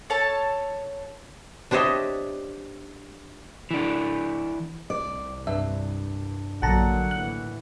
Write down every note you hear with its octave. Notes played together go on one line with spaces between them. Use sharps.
A4 C#5 A5
D4 G4 C5 C#5 D#5 E5
E3 D4
C2 D5
G2 E5
A#1 D3 F#3 A#3 F#5 A5 A#5
A2 E3 F#6